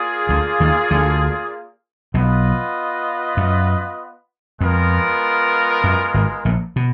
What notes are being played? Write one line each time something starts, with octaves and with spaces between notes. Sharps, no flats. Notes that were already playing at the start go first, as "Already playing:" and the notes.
Already playing: A#3 F4 G#4 D5
D2 D3
D#2 D#3
D2 D3
B1 B2 B3 F4 B4 D#5
F#2
F2 G#3 B3 F4 A#4
F#2
G#1 G#2
A#1 A#2
B2